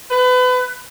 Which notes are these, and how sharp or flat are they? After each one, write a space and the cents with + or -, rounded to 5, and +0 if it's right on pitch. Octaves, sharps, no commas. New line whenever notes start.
B4 +30